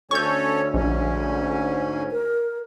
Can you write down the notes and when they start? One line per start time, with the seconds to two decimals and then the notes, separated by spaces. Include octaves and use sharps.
0.11 D2 C#4 A4 C#5 C#6 G6
0.74 A#1 G#2 C#4
2.12 A#4